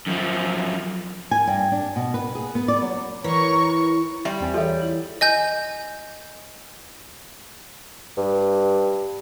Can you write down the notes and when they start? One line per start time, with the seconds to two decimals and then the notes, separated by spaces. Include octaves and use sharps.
0.07 F#2 F3
1.31 G#5
1.47 G2
1.72 D4
1.96 B2
2.14 B4
2.35 G#4
2.55 B3
2.68 D5
2.82 F#3
3.24 E3 A#4 C#5 C#6
4.25 G3 E5
4.41 E2 C4 G#5
4.54 E3 F4 G#4 A4 C#5 E5
4.82 E4
5.21 D#5 G#5 G6
8.17 G2